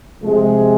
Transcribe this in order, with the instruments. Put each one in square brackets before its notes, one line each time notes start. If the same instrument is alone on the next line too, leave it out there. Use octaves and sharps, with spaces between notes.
[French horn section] C3 F3 G#3